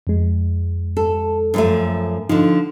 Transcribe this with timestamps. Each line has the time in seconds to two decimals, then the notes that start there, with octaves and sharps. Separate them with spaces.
0.07 F2 G#3
0.97 A4
1.54 F#2 F3 A3
2.29 D3 F3 D#4